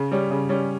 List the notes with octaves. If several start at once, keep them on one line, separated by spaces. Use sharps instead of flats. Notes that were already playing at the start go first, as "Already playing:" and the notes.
Already playing: C#3
G3 C#4
C#3
G3 C#4